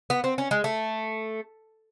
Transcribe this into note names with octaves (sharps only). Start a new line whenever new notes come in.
B3
C4
C#4
G#3
A3